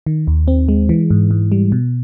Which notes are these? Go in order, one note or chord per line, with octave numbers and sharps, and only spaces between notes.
D#3
D#2
C4
G#3
E3
G#2
G#2
G3
B2